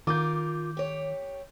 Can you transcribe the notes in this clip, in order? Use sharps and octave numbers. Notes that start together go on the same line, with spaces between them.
D#3 F4 A#4 D6 G6
G4 C#5